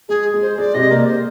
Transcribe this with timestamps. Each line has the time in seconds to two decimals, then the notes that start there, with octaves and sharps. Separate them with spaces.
0.09 G#3 G#4
0.34 G#3
0.42 C5
0.58 G#3 D5
0.74 C3 C4 D#5
0.91 A#3 A#4 D5
1.07 C5